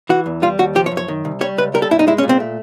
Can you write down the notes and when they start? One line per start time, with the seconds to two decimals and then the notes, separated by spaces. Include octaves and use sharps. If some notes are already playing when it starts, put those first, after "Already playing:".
0.09 E3 F#4
0.26 E2
0.42 G3 F4
0.59 D#2 F#4
0.75 F3 G4
0.86 C#5
0.91 F#2
0.97 C#5
1.08 D#3
1.25 C2
1.41 G3 C#5
1.58 C#2 B4
1.74 G3 A#4
1.82 A4
1.91 G2 E4
1.99 D#4
2.07 G#3 E4
2.18 C#4
2.23 A#2
2.29 C4
2.40 A3